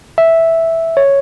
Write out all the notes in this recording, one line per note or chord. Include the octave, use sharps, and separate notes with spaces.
E5
C#5